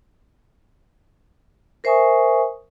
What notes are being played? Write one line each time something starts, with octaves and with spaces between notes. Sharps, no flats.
A#4 C5 E5 G#5 C#6 D#6